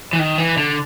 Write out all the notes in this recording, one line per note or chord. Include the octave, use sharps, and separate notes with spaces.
E3
D#3
E3
D3